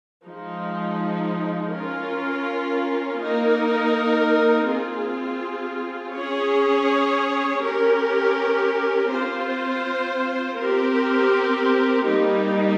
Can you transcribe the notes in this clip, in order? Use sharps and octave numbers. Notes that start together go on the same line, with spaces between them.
F3 G#3 D#4
C#4 F4 A#4
A#3 D#4 A#4
C4 F4 G#4
C#4 G#4 C#5
C#4 G4 A#4
C4 F4 C5
C4 G4 A#4
G3 A#3 D#4 G4